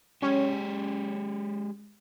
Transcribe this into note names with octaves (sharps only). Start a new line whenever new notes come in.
G#3 C#4 G4